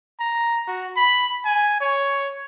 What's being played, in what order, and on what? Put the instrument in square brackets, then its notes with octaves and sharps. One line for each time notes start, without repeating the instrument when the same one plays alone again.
[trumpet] A#5
F#4
B5
G#5
C#5